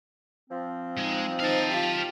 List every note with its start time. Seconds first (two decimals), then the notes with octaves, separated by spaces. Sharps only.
0.50 F3 C4
0.97 G#3 D#4
1.40 D#4 C5 F5 A5
1.71 F4 G4